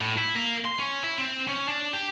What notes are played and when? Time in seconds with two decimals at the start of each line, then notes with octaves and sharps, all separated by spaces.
0.01 A2
0.18 E4
0.36 A#3
0.65 C6
0.80 C#4
1.03 E4
1.18 C4
1.48 C#4
1.68 D4
1.93 G4